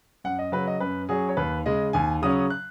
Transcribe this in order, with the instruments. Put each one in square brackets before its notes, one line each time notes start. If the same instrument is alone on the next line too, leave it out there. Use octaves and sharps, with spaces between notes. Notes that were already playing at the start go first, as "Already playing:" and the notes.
[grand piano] F#2 F#5
D#5
C#3 F#3 B4
D#5
F#2 B4
F#3 C#4 G#4
C#5
D#2 B4
C#3 G#3 D#5
D#2 G#5
C#3 F#3 C#4 D#6
F#6